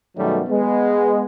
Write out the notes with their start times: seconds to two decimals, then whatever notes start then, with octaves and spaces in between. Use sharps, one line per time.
0.17 F#2 B2 D#3 F#3 G3 A3
0.49 G#3 B3